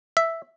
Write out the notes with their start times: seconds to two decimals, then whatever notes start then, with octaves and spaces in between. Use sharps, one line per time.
0.17 E5